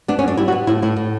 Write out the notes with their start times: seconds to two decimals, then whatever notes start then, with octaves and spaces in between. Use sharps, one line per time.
0.08 B3 D4
0.19 C#4
0.23 F#2
0.28 D4
0.37 G3 E4
0.48 F#4
0.52 B3
0.67 A2 E4
0.82 A2 E4
0.96 A2